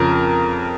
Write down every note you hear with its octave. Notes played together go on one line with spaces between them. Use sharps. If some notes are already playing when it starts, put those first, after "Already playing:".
Already playing: F2 C#3 F3 A#4